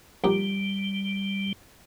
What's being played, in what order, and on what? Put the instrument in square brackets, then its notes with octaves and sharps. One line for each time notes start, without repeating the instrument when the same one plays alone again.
[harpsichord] A#1 D#4 G4 [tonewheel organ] G3